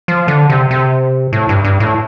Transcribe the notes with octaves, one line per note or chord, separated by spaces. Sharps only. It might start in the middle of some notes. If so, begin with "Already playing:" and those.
F3
D3
C3
C3
A2
G2
G2
A2